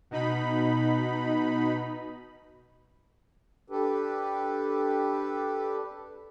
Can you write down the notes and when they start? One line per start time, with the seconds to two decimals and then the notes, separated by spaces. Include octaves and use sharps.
0.11 B2 D#4 B5
3.70 D4 G4 A4 B4